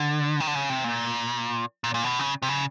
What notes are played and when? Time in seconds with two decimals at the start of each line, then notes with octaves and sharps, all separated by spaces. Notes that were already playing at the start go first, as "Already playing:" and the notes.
Already playing: D3
0.40 D#3
0.47 D3
0.55 C#3
0.70 C3
0.84 A#2
1.84 A#2
1.94 A#2
2.04 B2
2.19 C#3
2.42 C3
2.49 C#3